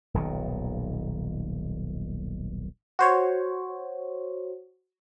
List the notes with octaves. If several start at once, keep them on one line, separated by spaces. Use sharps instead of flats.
D#1 B1 A#2 D#3
F#4 C5 C#5